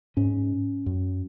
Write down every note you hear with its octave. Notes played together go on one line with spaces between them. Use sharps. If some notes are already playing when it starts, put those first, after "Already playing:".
G#2 C#4
F#2